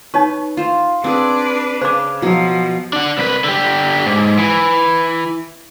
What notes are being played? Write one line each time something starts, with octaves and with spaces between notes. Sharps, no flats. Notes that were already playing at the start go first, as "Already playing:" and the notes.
D#4 B4 C#5 C#6
F4 C5
C4 D4 G#4 B4
C#3 C5 D6
B2 F3 F#3
D4 F#5
C2 B4
D3 G4
G#2
E3